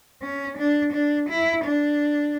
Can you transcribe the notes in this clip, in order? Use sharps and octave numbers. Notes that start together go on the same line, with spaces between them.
C#4
D4
D4
E4
D4